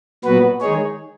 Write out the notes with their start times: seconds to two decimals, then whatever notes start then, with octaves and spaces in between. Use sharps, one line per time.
0.25 A#2 F#3 B3 F#4 B4
0.61 D#3 G#3 D#4 G#4 C#5